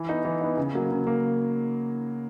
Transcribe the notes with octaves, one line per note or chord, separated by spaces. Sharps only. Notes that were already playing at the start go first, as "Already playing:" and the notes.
Already playing: E3
B3 D#4
E3
B3 D#4
C#3
F#3 A#3
C#3
A#3